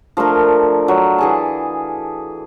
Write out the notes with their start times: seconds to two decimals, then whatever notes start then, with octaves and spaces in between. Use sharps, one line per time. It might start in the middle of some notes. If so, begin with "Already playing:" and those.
0.17 F3 A3 D4 A#4
0.88 F#3
1.18 E3 G#4 A5